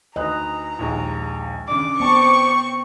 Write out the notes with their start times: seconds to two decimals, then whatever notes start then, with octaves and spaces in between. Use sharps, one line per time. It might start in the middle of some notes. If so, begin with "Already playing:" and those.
0.16 D2 B4 D#5 A#5 F#6
0.79 A#1 D#2 G#3
1.68 C#3 D4 D6
2.00 B3 C4 D5 A5 C#6